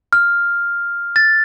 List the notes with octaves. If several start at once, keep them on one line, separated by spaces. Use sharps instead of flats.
F6
A6